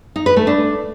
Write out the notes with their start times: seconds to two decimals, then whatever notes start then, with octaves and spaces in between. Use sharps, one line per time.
0.16 D#4
0.26 B4
0.37 A3
0.47 D4